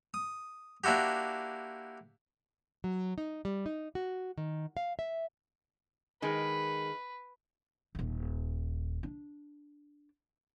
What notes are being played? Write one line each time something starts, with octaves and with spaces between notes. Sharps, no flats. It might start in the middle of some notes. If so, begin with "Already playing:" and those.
D#6
A#3 D4 E4 F#4 G4
F#3
D#4
G3
D#4
F#4
D#3
F5
E5
D#3 G#3 B4
D#1 D#2
D4